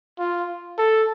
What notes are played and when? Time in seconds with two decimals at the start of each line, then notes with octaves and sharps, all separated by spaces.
0.19 F4
0.78 A4